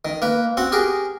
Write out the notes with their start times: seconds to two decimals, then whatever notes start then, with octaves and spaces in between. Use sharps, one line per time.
0.05 D#3
0.22 A#3 B4
0.57 C4 F#4 F#5
0.72 G4 G#4 A#4